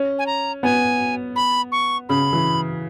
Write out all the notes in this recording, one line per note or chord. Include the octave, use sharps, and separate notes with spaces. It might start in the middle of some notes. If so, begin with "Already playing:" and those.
Already playing: C#4
G#5
A#5
B3 G#5
B5
C#6
C#3 B5
E3